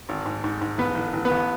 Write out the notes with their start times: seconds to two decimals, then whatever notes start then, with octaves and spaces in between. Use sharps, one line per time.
0.09 G#1
0.26 G#2
0.44 G#2
0.61 G#2
0.78 A1 B3 B4
0.95 A1
1.13 A1
1.25 B3 B4
1.31 A1